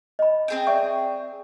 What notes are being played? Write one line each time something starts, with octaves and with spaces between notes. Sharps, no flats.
D#5 B5
C4 G#4 G5
D5 E5 C#6